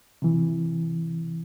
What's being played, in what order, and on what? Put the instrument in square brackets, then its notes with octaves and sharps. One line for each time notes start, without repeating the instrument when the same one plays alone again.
[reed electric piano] C3 E3